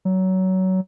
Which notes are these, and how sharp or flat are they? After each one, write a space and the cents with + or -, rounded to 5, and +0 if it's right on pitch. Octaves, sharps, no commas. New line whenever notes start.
F#3 +20